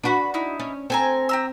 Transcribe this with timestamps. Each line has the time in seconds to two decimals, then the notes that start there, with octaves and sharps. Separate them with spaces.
0.04 D4 F#4 B4 B5
0.34 D#4 E4
0.59 C#4
0.90 C4 A4 G#5 A#5
1.29 G4 A#5 E6